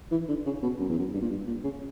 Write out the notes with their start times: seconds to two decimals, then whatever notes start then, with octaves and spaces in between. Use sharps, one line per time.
0.11 E3
0.28 D3
0.46 C#3
0.62 B2
0.79 F#2
0.89 E2
0.98 F#2
1.13 G2
1.22 A#2
1.30 G2
1.47 A#2
1.64 C#3